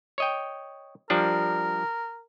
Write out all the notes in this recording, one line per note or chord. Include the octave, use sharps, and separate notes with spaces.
C#5 D#5 G5
F3 G3 D4 A#4